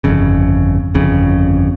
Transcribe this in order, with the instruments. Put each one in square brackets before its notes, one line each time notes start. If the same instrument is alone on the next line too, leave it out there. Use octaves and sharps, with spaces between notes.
[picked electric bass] G1 F2 C#3
G1 F2 C#3